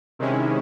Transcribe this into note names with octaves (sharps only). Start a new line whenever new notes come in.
C3 D#3 G#3 C#4 E4